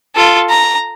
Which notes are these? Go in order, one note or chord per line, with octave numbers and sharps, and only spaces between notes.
F4 A4
A#5